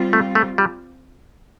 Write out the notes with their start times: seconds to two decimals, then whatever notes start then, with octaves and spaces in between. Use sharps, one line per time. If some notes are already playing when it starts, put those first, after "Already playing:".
Already playing: G3 C4 F4
0.13 A3
0.35 A3
0.58 G3